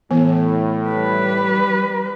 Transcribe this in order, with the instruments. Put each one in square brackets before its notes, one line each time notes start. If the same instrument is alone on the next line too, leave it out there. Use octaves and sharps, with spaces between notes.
[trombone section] A2 [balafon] E3 B3
[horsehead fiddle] G3 B4